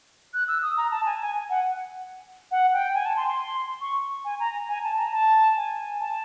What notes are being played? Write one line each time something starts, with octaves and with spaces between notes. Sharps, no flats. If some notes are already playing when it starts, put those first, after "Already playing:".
F#6
E6
D#6
A#5
A5
G#5
G#5
F#5
F#5
G5
G#5
A5
C6
C6
C#6
G#5
A#5
G#5
A5
A#5
A5
G#5
A5